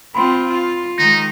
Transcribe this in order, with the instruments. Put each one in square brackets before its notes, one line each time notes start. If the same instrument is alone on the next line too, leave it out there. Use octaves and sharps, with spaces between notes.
[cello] C4 F4 [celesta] B5 C6
[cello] F4
[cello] D#3 G#3 [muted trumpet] D#4 [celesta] A#6